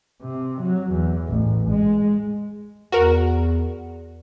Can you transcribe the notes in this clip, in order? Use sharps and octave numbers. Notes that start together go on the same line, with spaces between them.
C3
F#3
E2
A1
G#3
E2 F#4 A#4